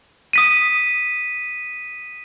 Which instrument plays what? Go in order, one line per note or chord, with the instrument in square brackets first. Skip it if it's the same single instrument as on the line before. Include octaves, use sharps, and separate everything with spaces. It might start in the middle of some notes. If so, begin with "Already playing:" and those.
[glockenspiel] D#6 B6 D#7